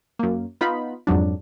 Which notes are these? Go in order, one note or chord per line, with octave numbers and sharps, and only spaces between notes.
F#2 A#3
B3 D#4 F4 B5
F2 G#2 F#3 D4